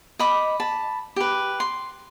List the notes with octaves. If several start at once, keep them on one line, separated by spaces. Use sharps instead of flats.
D#5 B5 D6
A5 B5
G4 B4
C6